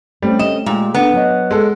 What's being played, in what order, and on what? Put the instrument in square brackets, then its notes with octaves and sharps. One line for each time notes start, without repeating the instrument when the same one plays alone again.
[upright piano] G3 [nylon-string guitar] A3 C4 C#4
[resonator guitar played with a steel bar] D#5 [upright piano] E7
[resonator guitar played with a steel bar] A#2 [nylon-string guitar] G#3 G4
[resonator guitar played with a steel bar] B3 [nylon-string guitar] D4 A4
[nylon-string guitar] F#3 D#5
[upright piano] G#3 A4